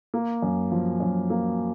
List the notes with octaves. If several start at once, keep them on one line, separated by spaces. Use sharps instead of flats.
A#3
F#2
F3
F#2
A#3